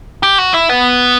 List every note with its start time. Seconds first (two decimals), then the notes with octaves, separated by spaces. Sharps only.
0.23 G4
0.38 F#4
0.54 E4
0.69 B3